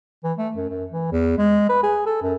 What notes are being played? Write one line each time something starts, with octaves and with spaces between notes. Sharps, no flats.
E3
A3
F#2
F#2
E3
E2
G#3
B4
G#4
A4
F#2